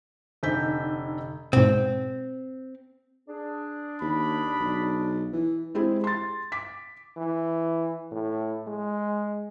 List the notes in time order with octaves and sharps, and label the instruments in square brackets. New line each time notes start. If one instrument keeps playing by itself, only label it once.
[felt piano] F1 D3 D#4 G#5 G6 B6
[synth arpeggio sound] G#2 B2 [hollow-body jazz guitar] C4
[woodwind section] D4 G#4
[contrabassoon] D#2 [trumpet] B5
[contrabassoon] B1
E3
[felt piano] G#3 C4 E4 G4 G#4
C6 A6
D6 B6
[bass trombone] E3
A2
G#3